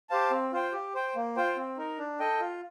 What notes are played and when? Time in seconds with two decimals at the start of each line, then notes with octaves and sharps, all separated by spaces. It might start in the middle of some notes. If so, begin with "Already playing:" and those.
0.10 G4 C5 F5 A5
0.31 C4
0.53 F4 C5 G5
0.72 G4
0.95 C5 G5
1.16 A#3
1.36 F4 C5 G5
1.57 C4
1.77 D#4 A#4
1.99 D4
2.20 A4 D#5 G5
2.40 F4